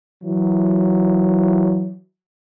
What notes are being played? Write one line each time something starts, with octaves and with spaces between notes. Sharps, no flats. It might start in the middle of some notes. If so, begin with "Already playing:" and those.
E3 F#3